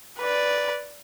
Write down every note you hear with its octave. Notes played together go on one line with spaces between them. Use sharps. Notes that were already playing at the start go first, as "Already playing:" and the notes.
B4 D5